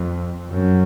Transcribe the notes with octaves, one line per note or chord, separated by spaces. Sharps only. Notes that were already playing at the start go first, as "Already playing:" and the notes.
Already playing: F2
F#2